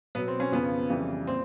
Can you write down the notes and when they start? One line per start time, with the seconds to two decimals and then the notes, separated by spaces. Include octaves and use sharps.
0.15 B2 F#3 B3
0.28 C4
0.40 C#4
0.52 F2 C#3 F3 B3
0.90 F2 C#3 E3 G3
1.27 A#2 C4